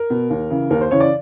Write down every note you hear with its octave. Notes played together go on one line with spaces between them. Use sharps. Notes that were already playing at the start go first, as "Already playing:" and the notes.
Already playing: A#4
B2
D#2
C#3 E3
D#2 A#4
C5
C#3 E3 C#5
D5